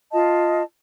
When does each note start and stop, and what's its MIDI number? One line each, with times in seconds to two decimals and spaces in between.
0.13 0.62 65
0.13 0.62 75
0.13 0.62 81